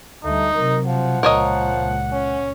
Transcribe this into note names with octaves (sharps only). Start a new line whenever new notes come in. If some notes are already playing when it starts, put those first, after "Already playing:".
D2 G3 A3 D#4
C3 F#3 A#4
F3 F#5
C#2 A#2 F3 A#4 C#5 D#5
C#4